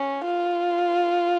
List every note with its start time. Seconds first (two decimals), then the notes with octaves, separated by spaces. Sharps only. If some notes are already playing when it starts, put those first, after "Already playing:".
Already playing: C#4
0.24 F4